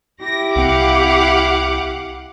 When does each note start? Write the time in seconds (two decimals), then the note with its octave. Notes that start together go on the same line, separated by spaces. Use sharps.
0.23 E4 G4 A#6
0.56 C2 C4 F5 F#5 D6